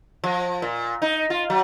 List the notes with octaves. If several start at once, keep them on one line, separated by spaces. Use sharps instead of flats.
F3
A#2
D#4
F4
F#3